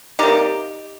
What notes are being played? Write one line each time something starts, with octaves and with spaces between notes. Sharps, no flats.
C3 G3 A#3 D#4 G4